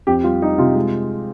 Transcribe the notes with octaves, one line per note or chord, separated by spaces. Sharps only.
F2 G4
G3 F4
G3 D#4
C3 F4
G#3